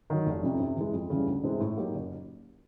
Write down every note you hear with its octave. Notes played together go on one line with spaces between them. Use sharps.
D#3 F#3
F1
F2 C3
C3
E3 G#3
F2
C#3 E3 G3
D2
C3 E3 G#3 C4
A2
F#3 A#3 D#4 G4
F#1